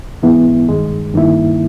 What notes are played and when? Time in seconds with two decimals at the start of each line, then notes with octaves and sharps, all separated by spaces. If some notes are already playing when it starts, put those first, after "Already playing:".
0.23 G#2 E3 G#3 B3 E4
0.69 G2 D#3 G#3
1.14 G2 D#3 A#3 E4